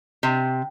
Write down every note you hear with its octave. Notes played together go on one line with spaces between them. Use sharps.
C3